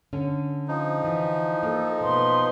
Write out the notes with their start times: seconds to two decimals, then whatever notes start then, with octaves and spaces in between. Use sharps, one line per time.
0.13 D3 C#4
0.68 F3 D#4
1.05 D3 E3
1.63 A#3 A4
2.01 B2 A#3 B4 C6